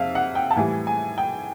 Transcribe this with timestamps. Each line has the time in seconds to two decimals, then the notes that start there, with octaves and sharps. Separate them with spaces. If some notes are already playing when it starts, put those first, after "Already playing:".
Already playing: F2 E5 F5
0.15 F#5
0.35 G5
0.51 A5
0.56 A2 E3 G3 G#5
0.87 G#5
1.18 G5